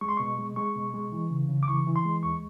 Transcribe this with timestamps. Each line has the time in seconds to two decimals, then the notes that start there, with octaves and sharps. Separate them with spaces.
0.01 G#3 C#6
0.09 C6
0.17 B2 C#6
0.38 G#3
0.56 G#3 C#6
0.76 B2
0.94 G#3
1.12 E3
1.30 C#3
1.49 C#3
1.63 D6
1.68 E3 C#6
1.87 E3
1.96 C6
2.05 G#3
2.23 D#2 C#6